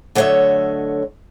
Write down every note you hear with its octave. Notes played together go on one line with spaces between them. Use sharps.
D3 F#3 A3 C#5 D#5 E5